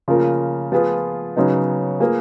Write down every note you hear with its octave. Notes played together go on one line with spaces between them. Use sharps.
C#3 F3 A#3 F4 A#4
F3 B3 F4 G#4 B4
C#3 F#3 B3 D#4
A#3 F4 G#4 B4